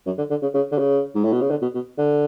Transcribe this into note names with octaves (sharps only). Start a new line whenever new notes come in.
F#2
D3
D3
C#3
C#3
D3
C#3
G#2
A2
B2
C#3
D3
B2
B2
D3